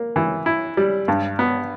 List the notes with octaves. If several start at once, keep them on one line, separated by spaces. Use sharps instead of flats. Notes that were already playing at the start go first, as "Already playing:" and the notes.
Already playing: A#3
E3
E4
G3
G2
B3